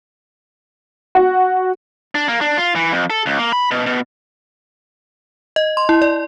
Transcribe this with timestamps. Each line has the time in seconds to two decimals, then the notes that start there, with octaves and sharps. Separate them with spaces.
1.15 F#4
2.15 D4
2.28 A#3
2.41 D4
2.57 F4
2.76 E3
2.92 F2
3.10 A4
3.26 C#2
3.38 A#3
3.53 B5
3.71 B2
3.86 B2
5.56 D#5
5.77 C6
5.89 E4
6.02 D5